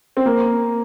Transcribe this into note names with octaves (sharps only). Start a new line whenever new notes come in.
C4
A#3